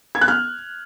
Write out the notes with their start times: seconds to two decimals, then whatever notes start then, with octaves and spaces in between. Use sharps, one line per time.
0.15 G#6
0.21 F#6
0.28 F6